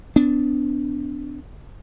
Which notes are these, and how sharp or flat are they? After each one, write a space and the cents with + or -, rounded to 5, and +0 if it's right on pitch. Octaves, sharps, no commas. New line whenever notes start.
B3 +40 D4 -10